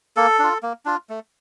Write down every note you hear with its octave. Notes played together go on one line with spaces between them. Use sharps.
A#3 A4
D4 F4
A#3
D4 F4
A3